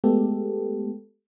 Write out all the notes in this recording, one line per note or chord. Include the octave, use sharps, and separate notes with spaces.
G#3 A3 B3 G4 A4